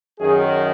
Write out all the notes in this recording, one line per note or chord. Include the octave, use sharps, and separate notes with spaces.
F#2 D#3 G#4